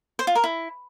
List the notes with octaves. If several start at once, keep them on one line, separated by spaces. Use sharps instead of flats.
C5
F4
A#4
E4